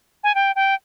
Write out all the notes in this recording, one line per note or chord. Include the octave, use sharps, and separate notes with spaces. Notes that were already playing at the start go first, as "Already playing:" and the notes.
G#5
G5
G5